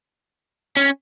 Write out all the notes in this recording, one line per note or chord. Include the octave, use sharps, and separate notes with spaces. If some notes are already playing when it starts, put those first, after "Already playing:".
C#4